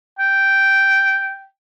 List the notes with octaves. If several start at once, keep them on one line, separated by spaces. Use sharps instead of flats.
G5